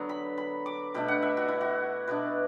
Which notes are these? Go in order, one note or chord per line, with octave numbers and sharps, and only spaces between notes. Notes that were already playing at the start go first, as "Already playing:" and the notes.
Already playing: D3 F#3 B3
B5
B5
D6
B2 A3 D4 B5
F#5
E5
F#4
E4
F#4
B2 B3 D4 B4